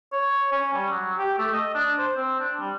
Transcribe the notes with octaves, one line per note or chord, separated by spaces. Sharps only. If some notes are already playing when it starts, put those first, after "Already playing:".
C#5
C#4
G3
F#3
G4
A3
D#5
D4
C5
C4
D4
G3